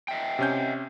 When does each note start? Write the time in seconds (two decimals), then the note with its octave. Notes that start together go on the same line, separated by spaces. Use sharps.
0.08 D#5 E5 G5
0.39 C3 C#4 G6